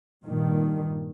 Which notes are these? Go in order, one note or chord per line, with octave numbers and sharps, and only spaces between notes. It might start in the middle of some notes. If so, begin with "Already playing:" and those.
G2 A#2 D#3